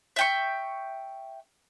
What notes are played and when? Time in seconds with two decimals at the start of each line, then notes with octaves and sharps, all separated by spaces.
0.16 E5 G5 C#6